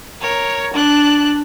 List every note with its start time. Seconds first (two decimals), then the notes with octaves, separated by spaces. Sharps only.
0.22 A#4 C#5
0.74 D4 F#6